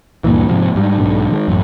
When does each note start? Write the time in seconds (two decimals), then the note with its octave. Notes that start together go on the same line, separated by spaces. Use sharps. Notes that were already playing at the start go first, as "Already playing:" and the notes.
0.24 D2 G2 A#2 E3
0.49 G#2 C3 F3
0.75 G#2 G3
0.98 B1 G#2 D3
1.31 D#3 G#3
1.48 A1 F#2